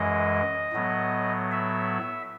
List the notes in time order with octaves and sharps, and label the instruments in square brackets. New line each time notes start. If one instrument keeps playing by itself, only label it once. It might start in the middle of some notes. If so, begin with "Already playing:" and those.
Already playing: [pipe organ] F#2 E3 G#3 D#5
A2 F#3 B3
E5